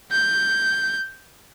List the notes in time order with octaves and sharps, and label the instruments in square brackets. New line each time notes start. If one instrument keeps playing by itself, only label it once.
[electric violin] G6